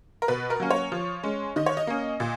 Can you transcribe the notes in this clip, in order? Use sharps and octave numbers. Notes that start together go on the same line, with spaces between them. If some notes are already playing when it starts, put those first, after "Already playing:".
A#4
B2 B4
A#4
F#3 A#3 C#4
C#5
F3
G#3 C#4
D#3 D#5
C#5
D#5
A#3 C#4
A#2